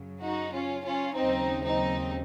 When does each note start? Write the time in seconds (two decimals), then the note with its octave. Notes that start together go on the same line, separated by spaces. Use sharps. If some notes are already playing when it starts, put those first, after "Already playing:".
Already playing: F#2 C#3 F#3
0.21 D#4 F#4
0.52 C#4 F4
0.84 C#4 F4
1.14 D#2 C#3 F#3 C4 D#4
1.62 C4 D#4